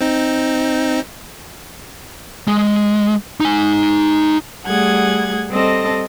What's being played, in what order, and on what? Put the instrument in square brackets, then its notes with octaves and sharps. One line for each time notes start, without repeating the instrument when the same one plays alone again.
[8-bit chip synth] C4 D#4
[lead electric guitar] G#3
D#4 G#5
[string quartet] G3 A3 G#4 F#5 G#6
G3 C4 A4 D#5 A5 A#6